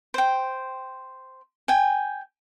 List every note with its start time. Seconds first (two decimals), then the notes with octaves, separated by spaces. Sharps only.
0.14 C5 G5
1.68 G5 G#5